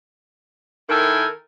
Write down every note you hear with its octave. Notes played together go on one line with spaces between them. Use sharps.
D#3 E4 A4 A#4 G5 G#5